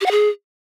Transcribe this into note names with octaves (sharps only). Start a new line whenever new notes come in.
G4
F#5
G#4